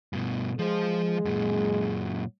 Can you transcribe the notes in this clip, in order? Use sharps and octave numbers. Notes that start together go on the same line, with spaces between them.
G2 B2
F3 G#3 C5
F#2 A#2